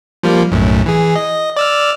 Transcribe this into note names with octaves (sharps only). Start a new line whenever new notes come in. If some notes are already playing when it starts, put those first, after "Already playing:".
F3 G3 A#3
B1 F#2 A2
E3 G#4
D#5
D5 E6 F6